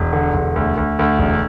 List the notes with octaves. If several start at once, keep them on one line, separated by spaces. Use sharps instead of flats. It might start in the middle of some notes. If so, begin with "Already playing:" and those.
Already playing: E1
D3
E1
D2
D2
D2
E1